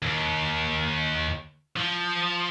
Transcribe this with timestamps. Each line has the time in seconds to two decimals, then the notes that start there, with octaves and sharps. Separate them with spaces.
0.02 D#2
1.76 F3